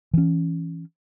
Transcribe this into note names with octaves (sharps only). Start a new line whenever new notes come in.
E3 C#4